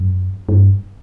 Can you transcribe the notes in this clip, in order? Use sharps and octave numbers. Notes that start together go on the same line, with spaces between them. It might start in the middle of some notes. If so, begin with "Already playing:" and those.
Already playing: F#2
G2